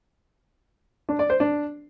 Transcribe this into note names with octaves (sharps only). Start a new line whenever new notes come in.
D4
D5
C5
D4